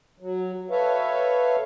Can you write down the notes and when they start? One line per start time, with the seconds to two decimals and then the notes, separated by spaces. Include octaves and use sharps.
0.20 F#3
0.70 A4 B4 C#5 E5 F5